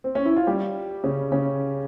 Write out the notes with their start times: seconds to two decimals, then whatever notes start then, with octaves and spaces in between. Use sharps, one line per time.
0.04 C4
0.15 C#4
0.26 E4
0.36 F4
0.47 G3 G4
1.04 C#3 C#4
1.32 C#3 C#4